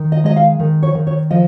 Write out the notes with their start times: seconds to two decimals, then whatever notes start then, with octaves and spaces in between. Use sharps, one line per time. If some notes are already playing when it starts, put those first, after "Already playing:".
Already playing: D#3
0.12 D#5
0.24 G#3 D#5
0.36 F5
0.59 D#3
0.83 C#5
0.95 D#3
1.07 C#5
1.30 F3 D#5